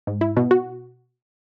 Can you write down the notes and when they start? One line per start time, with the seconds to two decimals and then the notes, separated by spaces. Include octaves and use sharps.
0.07 G#2
0.21 E4
0.37 B2
0.51 F#4